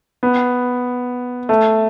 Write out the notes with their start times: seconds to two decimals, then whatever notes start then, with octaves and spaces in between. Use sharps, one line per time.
0.23 B3
1.49 A3